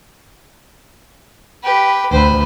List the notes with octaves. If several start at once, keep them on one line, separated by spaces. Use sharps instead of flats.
G4 B4
D2 D3 B4 C5